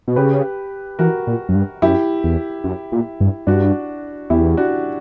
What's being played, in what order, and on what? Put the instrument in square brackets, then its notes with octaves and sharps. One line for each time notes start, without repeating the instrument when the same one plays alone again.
[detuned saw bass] B2
[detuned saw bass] C#3 [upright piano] G4 B4
[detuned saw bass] E3 [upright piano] F#4 A#4
[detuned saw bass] A#2
F#2
G2
[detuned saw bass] F#2 [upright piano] E4 G4
[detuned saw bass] E2
F#2
A#2
G2
[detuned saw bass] G2 [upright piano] D4 F#4
[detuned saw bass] E2 [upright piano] E4 G4
[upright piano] D4 F#4